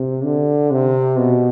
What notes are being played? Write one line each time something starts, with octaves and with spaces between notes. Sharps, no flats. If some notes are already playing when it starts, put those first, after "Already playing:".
Already playing: C3
D3
C3
B2